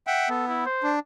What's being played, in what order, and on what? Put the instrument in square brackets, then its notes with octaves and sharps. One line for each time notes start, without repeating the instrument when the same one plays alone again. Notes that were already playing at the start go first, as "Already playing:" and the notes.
[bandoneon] E5 F#5 G5
[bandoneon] B3 [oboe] A4
[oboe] E4
C5
[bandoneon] D4